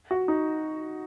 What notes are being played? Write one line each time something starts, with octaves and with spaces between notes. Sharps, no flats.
F#4
D#4